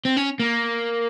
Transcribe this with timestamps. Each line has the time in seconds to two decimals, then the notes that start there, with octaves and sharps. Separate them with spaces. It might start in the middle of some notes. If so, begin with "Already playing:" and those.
0.05 C4
0.17 C#4
0.40 A#3